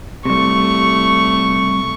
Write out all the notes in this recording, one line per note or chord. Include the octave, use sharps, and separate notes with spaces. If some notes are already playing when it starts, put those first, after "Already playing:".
C3 G3 A3 C#6